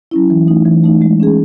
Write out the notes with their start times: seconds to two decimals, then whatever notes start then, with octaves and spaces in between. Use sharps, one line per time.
0.11 F#3 C#4 E4
0.30 E3
0.48 A3 D#4
0.65 E3
0.84 A3 D#4
1.02 G#3
1.20 C#4 G#4